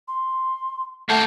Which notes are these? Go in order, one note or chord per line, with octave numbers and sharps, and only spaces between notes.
C6
A3 A#3 A4 F#5 A5 G6